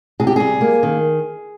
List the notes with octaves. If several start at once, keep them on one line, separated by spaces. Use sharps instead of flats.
C3 G#4
G4
G3 G#4
A#3
D#3